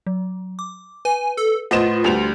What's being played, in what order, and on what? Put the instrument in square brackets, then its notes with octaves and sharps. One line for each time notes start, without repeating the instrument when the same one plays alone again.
[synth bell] F#3
D6
[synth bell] B4 [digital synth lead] G#5
[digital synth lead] A4
[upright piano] A2 D#5 E7 [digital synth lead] F4 [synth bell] B4 C5 F#5
[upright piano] D2 G3 F7